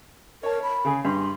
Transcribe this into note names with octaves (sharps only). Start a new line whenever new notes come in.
A#4 C#5 A5
B5
C#3 G#4
G2 C6